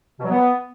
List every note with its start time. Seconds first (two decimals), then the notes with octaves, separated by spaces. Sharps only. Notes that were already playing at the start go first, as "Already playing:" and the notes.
0.19 B2
0.25 F#3
0.30 B3